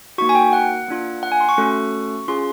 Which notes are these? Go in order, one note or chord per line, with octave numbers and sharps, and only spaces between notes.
A#3 D#4 F#4 C#6
G#5
G5
F#5
A#3 D4 F4
F#5
G#5
C6
C#6
A3 C#4 F#4 A4
C#4 F4 G#4 C6